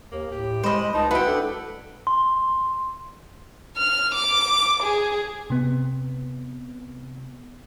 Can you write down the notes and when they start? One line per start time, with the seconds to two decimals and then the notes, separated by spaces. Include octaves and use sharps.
0.11 D#2 A#3
0.31 A2 G4
0.63 G#3 C5 D#5 B5
0.94 C#2 D#4 A5
1.11 E4 F#4 B4 F#5 G5
1.26 D4 A4
2.07 C6
3.77 F6
4.15 D6
4.83 G#4
5.50 C3 B3